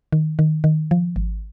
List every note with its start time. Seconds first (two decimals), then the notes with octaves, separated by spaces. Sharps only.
0.12 D#3
0.39 D#3
0.64 D#3
0.91 F3
1.16 G#1